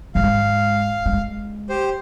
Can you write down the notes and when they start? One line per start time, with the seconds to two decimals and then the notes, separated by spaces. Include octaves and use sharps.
0.15 G#2 G#3 F5
1.06 G#3
1.69 G4 C5